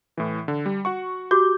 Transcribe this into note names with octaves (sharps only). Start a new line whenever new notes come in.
A2 E3
D3
G3
F#4 F#5 C#6
F#4 G4 D6 G6